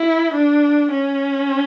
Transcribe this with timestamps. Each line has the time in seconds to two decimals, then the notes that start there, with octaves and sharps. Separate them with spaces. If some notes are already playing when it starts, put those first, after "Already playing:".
Already playing: E4
0.33 D4
0.92 C#4